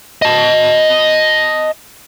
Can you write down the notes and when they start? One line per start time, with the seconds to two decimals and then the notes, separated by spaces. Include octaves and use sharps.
0.22 D#5 A5